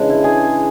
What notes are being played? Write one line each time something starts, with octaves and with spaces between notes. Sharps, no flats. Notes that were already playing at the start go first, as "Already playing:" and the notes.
Already playing: C#3 E3 G#3 D4
E4
G#4